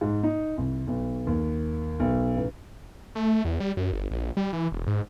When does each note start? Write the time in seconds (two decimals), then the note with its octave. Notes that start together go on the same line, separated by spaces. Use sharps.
0.01 G#2
0.23 D#4
0.58 C2
0.87 B1
1.27 D#2
2.00 B1
2.37 A1
3.15 A3
3.45 E2
3.60 G3
3.77 F#2
3.93 G1
4.11 A#1
4.37 G3
4.53 E3
4.72 E1
4.87 G#2